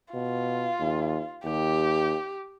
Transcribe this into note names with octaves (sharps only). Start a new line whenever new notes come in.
B2 F4
D#2
D#2 G4